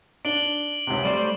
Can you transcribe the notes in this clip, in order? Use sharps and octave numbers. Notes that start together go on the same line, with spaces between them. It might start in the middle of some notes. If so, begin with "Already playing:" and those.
D4 D7 F#7 G7
C#2 C3
G3 A3 C5 D5